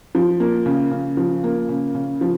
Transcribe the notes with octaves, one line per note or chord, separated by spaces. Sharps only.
F3
A#3
C#3
C#3
F3
A#3
C#3
C#3
F3